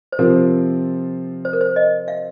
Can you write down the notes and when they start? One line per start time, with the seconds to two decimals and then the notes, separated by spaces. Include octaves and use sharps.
0.12 C5
0.19 C3 F3 C4 F4 A#4
1.45 C5
1.53 A#4
1.61 C5
1.76 D#5
2.08 F5